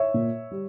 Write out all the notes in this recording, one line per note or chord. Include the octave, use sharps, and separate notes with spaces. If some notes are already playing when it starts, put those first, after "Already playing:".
Already playing: C#5 E5
A#2
G3